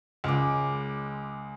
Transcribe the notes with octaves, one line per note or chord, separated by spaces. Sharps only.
C#2 G#3 D6